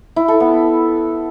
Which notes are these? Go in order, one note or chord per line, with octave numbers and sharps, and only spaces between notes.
E4
A4
B3